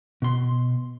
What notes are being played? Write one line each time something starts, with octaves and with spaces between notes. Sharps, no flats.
B2 C6